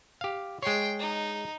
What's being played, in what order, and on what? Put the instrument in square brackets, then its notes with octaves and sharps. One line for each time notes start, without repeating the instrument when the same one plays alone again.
[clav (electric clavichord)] G4 F5
[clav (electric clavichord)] G#3 C#5 [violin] G5 C6
[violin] D#4